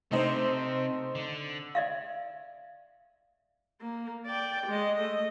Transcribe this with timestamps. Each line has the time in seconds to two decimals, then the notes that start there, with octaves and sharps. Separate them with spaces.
0.11 C3 A3 D#4 C5
1.15 D3
1.75 D5 E5 F5
3.81 A#3
4.26 D5 G5
4.67 G#3 D#5
4.96 A3 D#5